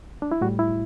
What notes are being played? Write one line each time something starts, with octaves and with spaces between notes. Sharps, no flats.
D4
E4
A2 G3 F#4
E4